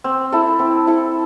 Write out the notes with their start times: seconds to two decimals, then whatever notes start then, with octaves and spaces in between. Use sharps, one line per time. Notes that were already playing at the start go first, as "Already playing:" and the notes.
0.04 C4
0.32 E4 A4
0.59 C4
0.87 E4 A4